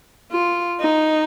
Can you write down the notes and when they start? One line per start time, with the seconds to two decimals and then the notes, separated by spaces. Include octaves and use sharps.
0.32 F4
0.81 D#4